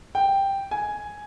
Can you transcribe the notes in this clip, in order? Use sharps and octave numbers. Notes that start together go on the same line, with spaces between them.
G5
G#5